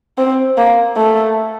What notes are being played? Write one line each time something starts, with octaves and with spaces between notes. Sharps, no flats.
C4
A#3
A3